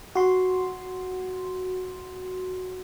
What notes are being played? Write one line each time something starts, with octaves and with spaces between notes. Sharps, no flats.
F#4 C6